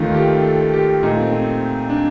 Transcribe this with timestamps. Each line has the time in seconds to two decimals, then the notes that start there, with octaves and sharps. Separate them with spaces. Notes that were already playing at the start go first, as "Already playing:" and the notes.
Already playing: D#2 D#3 A3 F4
0.15 G4
0.43 A4
0.73 G4
1.03 A#2 A3 D#4
1.17 C4
1.32 C4
1.90 D4